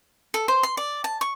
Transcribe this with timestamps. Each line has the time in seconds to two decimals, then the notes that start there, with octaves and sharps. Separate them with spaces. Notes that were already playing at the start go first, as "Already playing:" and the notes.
0.34 A4
0.48 C5
0.63 C6
0.77 D5
1.04 A5
1.21 C#6